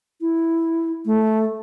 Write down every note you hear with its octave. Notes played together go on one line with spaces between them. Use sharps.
E4
A3